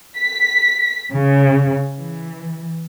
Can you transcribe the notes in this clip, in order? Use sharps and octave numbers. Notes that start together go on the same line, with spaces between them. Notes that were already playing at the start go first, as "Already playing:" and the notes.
B6
C#3
E3